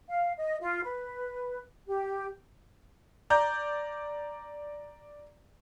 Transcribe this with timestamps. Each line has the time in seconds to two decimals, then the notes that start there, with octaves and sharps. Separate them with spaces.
0.09 F5
0.38 D#5
0.60 F4
0.83 B4
1.88 G4
3.30 D5 A#5 G6